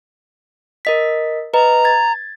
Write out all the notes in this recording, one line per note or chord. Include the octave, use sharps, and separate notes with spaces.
A#4 D#5 B6
B4 D#5 A#5
G#6 A6